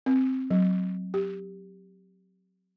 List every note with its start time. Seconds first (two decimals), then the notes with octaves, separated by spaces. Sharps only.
0.06 C4
0.51 F#3
1.14 G4